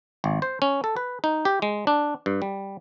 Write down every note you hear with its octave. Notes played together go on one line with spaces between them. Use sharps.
G#1
C5
C#4
A4
B4
D#4
G4
G#3
D4
G2
G3